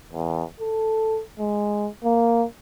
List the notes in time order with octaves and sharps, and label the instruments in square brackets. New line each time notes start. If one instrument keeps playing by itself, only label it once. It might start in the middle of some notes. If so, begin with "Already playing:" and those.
[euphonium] E2
A4
G#3
A#3